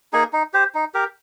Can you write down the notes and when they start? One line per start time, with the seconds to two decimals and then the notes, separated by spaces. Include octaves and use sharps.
0.13 A#3 D#4 G#4
0.33 D#4
0.54 G4 C5
0.75 D#4
0.94 G4 A#4